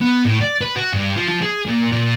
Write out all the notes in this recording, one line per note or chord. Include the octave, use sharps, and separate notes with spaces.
B3
A2
D5
B4
F#4
G2
F3
F3
G#4
A#2
A#2